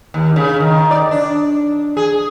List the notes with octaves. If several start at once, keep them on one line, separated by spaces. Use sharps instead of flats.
D#2
C#3
D#3
D5
D4
G#4